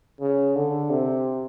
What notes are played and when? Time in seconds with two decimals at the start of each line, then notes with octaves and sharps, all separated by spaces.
0.21 C#3
0.55 D3
0.90 C3